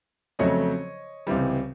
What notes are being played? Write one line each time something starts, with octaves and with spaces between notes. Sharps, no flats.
F2 C#3 F#3 A3 C#5 D#5
C#2 C3 E3 G3